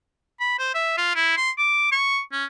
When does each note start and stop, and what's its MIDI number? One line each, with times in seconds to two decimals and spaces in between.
0.40 0.55 83
0.59 0.73 72
0.75 0.96 76
0.98 1.12 65
1.16 1.34 64
1.37 1.51 84
1.58 1.87 86
1.92 2.20 85
2.32 2.45 61